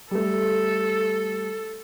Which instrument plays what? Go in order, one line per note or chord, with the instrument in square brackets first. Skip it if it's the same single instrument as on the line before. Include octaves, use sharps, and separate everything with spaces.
[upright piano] G3 A3 [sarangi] A4